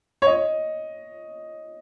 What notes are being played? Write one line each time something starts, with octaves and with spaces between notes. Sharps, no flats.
C#5
D#5